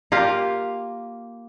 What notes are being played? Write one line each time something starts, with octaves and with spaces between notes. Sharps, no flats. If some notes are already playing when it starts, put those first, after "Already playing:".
A#3 F4 G4 F5